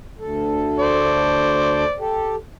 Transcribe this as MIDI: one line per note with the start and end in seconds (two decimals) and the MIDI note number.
0.19 1.84 38
0.19 1.84 69
0.79 1.96 72
0.79 1.96 74
1.99 2.36 67
1.99 2.36 69